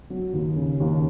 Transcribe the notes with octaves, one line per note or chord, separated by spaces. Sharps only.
F#3
D#2
C#3
D#2